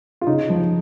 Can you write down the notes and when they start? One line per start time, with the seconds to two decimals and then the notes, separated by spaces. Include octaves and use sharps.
0.21 F4
0.27 C#3 D#4
0.50 F3